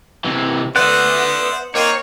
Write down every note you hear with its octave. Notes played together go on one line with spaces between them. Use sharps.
C3 E3
B3 C5 D5 E5 F#5
A#3 C4 D#4 C#5